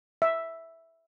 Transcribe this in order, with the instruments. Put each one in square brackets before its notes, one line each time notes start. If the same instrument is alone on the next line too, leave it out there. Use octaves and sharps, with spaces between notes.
[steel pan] E5